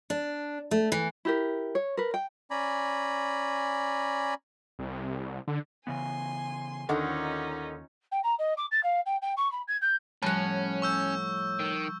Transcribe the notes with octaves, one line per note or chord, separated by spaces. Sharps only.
D4
A3
E3
E4 G4 A#4
C#5
A#4 B4
G5
C#4 D5 G#5 A#5 B5
C2
D3
C#3 E3 B3 G#5 C6
D#2 D3 D#3 C#4 D#4 F4 F#5
G5
A#5
D#5
D6
A6
F5
G5
G5
C#6
B5
G#6
G6
A2 F3 G3 C#4 F#5 A5
C#6 E6 G6
D#3